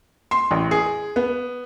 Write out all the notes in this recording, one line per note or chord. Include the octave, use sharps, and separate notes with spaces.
C6
A1
G#4
B3